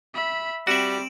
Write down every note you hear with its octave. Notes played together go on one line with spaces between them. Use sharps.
E5 B5
G3 C4 F#4 E5 D7 E7 F#7